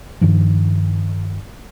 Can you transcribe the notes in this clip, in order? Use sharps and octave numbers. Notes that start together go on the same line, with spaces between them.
G2 D#3 F3